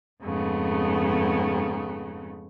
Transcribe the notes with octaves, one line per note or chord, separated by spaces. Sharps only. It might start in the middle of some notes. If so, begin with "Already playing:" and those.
F2 G#2 C#3 A3 B3